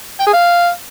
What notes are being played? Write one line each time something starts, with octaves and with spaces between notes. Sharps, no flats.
G5
G#4
F5